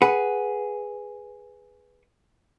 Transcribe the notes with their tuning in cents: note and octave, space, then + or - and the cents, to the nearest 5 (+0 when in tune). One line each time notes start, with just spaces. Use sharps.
G#4 +0 B4 +0 F#5 +0